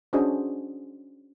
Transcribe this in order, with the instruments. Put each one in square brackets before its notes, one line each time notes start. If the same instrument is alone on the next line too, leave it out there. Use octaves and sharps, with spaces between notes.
[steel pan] C#4 D4 F#4 G#4 C5 D#5